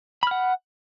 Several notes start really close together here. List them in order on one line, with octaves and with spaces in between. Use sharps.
B5 F6 F#5